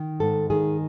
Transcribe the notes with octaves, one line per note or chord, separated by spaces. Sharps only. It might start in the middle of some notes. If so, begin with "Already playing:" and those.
Already playing: D#3
G#2 A4
D#3 G#4